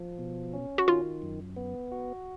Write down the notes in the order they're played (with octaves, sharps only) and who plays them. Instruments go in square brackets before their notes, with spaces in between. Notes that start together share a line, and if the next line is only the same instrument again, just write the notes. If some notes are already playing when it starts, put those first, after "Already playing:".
Already playing: [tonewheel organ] F3
B2
C#4
[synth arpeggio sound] F#4
[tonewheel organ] D#3 [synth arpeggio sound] F4
[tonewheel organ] F#2
B3
F#4